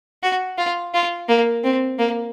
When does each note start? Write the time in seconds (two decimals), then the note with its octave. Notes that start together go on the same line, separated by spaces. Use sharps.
0.23 F#4
0.58 F4
0.94 F4
1.28 A#3
1.64 C4
1.99 A#3